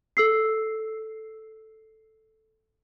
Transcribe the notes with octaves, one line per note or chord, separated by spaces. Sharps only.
A4 E6 C7